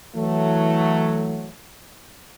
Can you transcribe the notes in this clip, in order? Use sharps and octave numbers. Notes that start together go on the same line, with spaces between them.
E3 F#3 A3